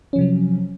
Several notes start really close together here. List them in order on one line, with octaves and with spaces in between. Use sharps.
C#4 F3 C3 F#3